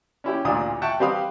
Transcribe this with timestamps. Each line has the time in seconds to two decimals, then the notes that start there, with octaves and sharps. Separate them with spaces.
0.24 C#4 E4 G4
0.45 A1 D2 A#2 D4 F4 D#6
0.82 E5 F#5 G5 A5 C#6
1.00 G3 C4 G4 B4 F5 D#6